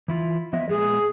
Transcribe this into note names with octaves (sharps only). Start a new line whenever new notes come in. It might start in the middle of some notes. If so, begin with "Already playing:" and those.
E3 E4 F4
F3 B3 D#5 E5
A#2 G#3 B3 G#4